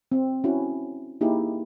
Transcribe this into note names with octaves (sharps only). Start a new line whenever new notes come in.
C4
C#4 E4 F#4
A#3 D#4 E4 G4 G#4